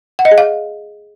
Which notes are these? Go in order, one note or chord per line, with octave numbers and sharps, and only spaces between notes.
F#5
D#5
G#4
F5